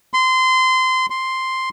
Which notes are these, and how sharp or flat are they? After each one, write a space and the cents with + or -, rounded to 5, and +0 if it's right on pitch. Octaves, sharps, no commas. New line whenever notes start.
C6 -20
C6 +0